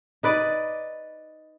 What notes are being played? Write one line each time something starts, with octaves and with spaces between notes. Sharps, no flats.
D#4 B4 D5 D#5